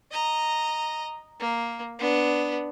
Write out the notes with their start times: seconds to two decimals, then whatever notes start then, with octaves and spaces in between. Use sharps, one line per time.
0.12 D#5 A#5
1.40 A#3
1.99 B3 D4